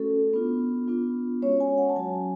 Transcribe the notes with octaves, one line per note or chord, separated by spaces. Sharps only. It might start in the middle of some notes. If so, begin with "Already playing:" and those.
Already playing: A3 C#4 F#4 A4
B3 D4 F4
B3 D4 F4
G#3 C#4 F#4 C#5
G#5
F#5
A5
F#3 C#4 F#4 G#5